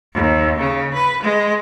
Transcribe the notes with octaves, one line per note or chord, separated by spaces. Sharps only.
D#2
C#3
B4
G#3